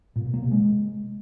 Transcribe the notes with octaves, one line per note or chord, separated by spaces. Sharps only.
A#2
B2
A#3
C3
G#3